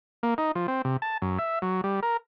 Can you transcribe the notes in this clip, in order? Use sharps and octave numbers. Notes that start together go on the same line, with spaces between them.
A#3
D#4
F3
C4
C3
A5
F#2
E5
F#3
G3
A#4